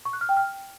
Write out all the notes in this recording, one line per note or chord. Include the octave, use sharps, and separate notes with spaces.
C#6
F#6
F6
G5
F6